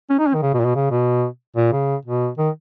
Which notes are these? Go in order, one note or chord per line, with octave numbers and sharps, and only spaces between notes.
C#4
D#4
C#4
D#3
C#3
B2
A#2
B2
C#3
B2
A#2
C#3
B2
D#3